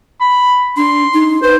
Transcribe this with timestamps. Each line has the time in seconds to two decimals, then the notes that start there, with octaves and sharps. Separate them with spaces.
0.21 B5
0.77 D4 C6
1.14 D#4
1.43 B4 C5